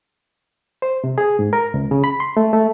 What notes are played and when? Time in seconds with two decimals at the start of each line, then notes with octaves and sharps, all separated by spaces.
0.82 C5
1.04 C3
1.18 G#4
1.39 G#2
1.53 A#4
1.74 C#2
1.91 C#3
2.04 B5
2.20 C6
2.37 A3
2.53 A3